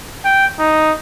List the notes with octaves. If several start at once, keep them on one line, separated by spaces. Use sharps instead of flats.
G5
D#4